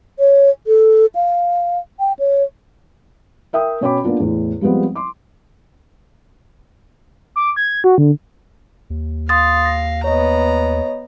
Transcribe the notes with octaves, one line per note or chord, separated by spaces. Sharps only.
C#5
A4
F5
G5
C#5
A#4 E5 G5 D#6
B2 C#4 C#5 G5 B5 D6
A#3 B3 D4 F4
E2 A2
F3 G3 G#3 B3 C4
C6 D6
D6
G#6
F#4
D3
D#2
F5 C6 D#6 A6
A#6
B3 C#5 D#5 A#5